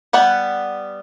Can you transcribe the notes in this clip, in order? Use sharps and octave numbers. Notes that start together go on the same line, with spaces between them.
G3 B3 F#5